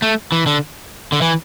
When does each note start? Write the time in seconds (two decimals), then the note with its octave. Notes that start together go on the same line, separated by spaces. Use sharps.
0.02 A3
0.32 E3
0.46 D3
1.12 D3
1.21 E3